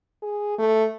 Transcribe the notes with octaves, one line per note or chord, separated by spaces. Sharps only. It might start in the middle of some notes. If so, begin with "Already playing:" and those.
G#4
A3